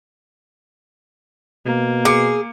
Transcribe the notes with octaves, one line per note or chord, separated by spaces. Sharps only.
B2 A#3
G#4 D6 C#7